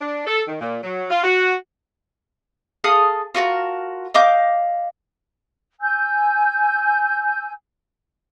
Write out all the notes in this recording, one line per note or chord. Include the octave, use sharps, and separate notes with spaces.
D4
A4
D#3
A#2
F#3
F4
F#4
G#4 A4 F5 D#6
F4 F#4 A#4 A5
D#5 F5 D6 G6
G#5 E6 G6